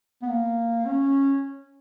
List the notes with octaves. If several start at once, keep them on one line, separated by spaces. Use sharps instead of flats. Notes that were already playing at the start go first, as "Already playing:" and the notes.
B3
A#3
C#4